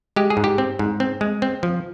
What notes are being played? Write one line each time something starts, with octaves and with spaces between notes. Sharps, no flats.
G#3 G4
G#4
G#2
G4
C4
G#2
C4
G#3
C4
F3